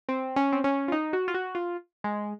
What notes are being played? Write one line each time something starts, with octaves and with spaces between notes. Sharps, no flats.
C4
C#4
C4
C#4
F4
D#4
F#4
F4
F#4
F4
G#3